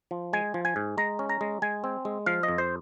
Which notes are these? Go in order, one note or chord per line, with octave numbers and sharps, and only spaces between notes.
F3
G#3 G#5
F3
G#5
G#2
G#3 A#5
C#4
A#5
G#3
G#3 G#5
C4
G#3
F3 F5
D#5
F2
C5